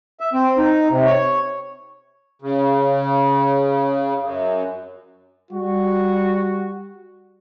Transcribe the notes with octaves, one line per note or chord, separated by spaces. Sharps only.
E5
C4
D#4
C3
C#5
C#3
F#2
G3 F#4